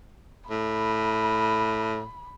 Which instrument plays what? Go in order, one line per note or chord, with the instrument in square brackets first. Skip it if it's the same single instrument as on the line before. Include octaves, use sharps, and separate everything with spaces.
[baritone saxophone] A2 [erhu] B5